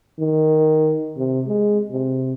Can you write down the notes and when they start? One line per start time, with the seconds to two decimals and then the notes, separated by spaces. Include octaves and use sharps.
0.19 D#3
1.17 C3
1.47 G#3
1.91 C3